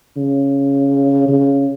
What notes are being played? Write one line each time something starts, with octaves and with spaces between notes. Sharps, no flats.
C#3
C#3